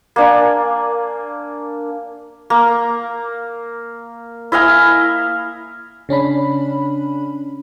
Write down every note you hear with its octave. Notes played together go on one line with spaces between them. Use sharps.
A#3 D4 G#5
A#3
E4 D#5 F5 G#5
C#3 C#4 D4 B5